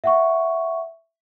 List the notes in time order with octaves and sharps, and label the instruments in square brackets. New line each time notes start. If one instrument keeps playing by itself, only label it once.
[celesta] E5 F#5 C#6